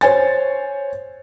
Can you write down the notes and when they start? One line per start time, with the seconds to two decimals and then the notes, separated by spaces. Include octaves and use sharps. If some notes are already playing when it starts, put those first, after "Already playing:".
0.01 C5 C#5 G#5 A6